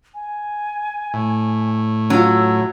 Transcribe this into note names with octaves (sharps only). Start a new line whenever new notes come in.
G#5
A2
F#3 C#4 F4 E6